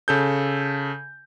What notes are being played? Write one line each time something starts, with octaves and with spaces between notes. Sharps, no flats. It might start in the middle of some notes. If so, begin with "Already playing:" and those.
C#3 A4 G6